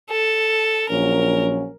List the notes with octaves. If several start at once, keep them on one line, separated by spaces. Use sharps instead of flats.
A4
A#1 F#3 C#4 A#4